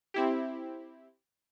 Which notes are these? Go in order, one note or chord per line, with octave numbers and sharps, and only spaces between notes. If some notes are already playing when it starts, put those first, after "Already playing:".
C4 E4 G4